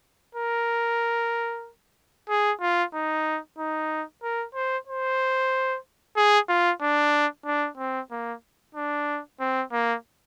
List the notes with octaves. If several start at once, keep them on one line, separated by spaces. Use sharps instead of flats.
A#4
G#4
F4
D#4
D#4
A#4
C5
C5
G#4
F4
D4
D4
C4
A#3
D4
C4
A#3